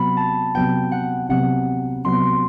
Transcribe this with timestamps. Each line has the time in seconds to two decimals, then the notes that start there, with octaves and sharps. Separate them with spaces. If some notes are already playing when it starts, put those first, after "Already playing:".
Already playing: C3 F#3 B3 B5
0.17 A5
0.55 C3 F#3 B3 G5
0.92 F#5
1.29 C3 F#3 B3 F#5
2.04 C3 F#3 B3 C6